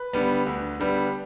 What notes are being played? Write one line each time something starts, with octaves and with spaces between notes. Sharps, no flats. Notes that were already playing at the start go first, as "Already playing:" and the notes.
Already playing: B4
D3 G3 B3
D2
D3 G3 B3